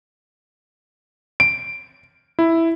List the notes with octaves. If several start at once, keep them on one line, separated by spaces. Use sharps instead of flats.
D7
E4